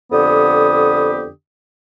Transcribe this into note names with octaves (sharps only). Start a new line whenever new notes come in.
F2 D3 B3 G4 D#6